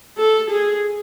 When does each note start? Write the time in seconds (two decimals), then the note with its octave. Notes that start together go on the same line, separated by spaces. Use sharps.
0.18 A4
0.51 G#4